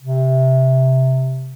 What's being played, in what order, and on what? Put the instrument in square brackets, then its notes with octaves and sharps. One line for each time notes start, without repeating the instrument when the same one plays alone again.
[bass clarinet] C3